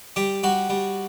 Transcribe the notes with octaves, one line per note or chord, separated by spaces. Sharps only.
G3 G4
G3 F#4
G3